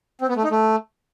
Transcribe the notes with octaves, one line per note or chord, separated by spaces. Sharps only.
C4
B3
A3
D#4
A3